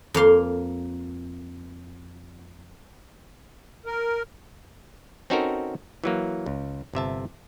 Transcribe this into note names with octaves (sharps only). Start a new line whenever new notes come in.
F2 A#3 F5 C6
A#4
C4 C#4 D#4 F#4 A4 A#4
E3 F#3 A#3
C#2
G1 C3 E5 A5